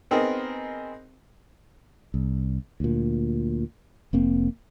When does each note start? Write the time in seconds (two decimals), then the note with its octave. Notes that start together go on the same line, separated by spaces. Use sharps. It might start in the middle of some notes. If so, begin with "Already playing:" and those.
0.11 B3 C4 D#4 G#4 A#4 D#5
2.14 C2
2.80 D2 A#2
4.13 F1 A#3 C4